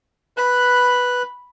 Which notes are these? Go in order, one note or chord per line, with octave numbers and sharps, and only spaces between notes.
B4 B5 F#6